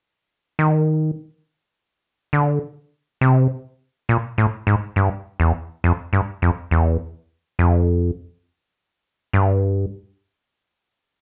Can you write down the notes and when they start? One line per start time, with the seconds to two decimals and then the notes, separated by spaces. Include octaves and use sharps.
0.59 D#3
2.33 D3
3.21 C3
4.09 A#2
4.38 A2
4.67 G#2
4.96 G2
5.40 E2
5.84 F2
6.13 G2
6.42 F2
6.71 E2
7.59 F2
9.33 G2